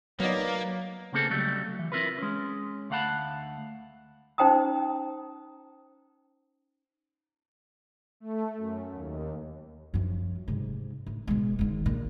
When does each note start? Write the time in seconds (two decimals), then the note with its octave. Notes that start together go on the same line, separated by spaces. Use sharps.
0.20 F#3 A#3 B3 D#4 D5
1.13 C#3 A3 A#3 C4 G#4 A4
1.30 C#2 F#3 G3 A3
1.79 E3
1.92 C4 E4 F4 A#4 B4
2.18 G#3 C#4
2.90 D2 A3 F5 F#5 A5 B5
4.38 C#4 D#4 C5 G5 A#5 D#6
8.20 A3
8.57 F#2
8.90 D#2
9.94 F#2 F3
10.48 G#2 C3
11.06 A2
11.27 B2 G#3
11.59 G#2 D#3
11.86 A#1 A#2